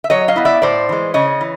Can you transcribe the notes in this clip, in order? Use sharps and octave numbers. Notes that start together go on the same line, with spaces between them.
E5
F#3 C#5 D#5
D#5 F5
B3 E4
D5 E5
A2 C5 D5
E3 G#3
C#3 C#5 D#5
E3